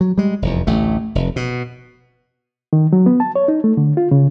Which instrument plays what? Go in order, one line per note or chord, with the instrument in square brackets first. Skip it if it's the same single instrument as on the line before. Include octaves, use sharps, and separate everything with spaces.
[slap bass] F#3
G3 G#3
F1 E2
A1 D2 A3
F1
B2
[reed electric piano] D#3
F#3
B3
A5
C#5
D#4
A3
D3
F4
C#3